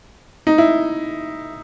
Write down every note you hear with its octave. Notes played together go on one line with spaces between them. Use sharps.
D#4
E4